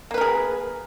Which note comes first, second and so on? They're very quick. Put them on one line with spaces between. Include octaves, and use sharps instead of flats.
A#3 B4 A#4 G#4